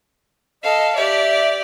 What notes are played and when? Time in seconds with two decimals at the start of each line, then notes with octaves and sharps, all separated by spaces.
0.63 A4 D#5 F5
0.95 G4 D5 E5